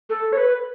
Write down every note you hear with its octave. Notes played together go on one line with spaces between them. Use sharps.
A4
C#5
B4